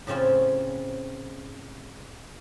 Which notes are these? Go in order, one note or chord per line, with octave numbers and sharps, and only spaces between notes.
A2 C#3 C4 C#4 F4